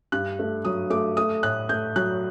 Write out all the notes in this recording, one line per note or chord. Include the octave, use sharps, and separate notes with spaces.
G2 F#6
A3
F#3 D#6
A3 D6
A3 D#6
A2 F#6
A3 G6
F#3 F#6